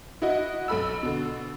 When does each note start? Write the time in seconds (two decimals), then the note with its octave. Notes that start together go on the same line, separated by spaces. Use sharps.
0.22 E4 F#4 D#5
0.68 B1 A4 B5 E6
1.03 B2 D3